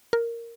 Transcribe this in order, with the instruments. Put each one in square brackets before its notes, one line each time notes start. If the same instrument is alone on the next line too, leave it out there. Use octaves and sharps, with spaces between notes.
[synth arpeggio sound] A#4